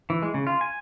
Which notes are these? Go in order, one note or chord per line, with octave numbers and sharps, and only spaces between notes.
E3
G#3
C#3
F4
G#5